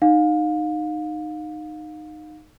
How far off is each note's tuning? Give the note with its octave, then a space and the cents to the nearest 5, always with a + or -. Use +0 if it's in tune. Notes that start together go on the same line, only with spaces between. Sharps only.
D#4 -15 F5 +30